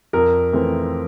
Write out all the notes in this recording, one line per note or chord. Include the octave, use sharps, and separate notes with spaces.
F2 A#4
E3 A3 C4